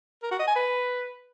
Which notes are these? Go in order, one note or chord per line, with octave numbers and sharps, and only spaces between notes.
A#4
F#4
D#5
G#5
B4